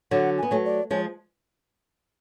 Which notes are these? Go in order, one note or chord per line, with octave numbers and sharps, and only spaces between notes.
D3 F#3 F#5
B3 G#5
F#3 A3
D5
F3 G#3 C#5